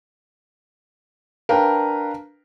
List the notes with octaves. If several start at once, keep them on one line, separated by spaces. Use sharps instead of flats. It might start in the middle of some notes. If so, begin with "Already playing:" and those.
D4 A#4 B4 F5 G5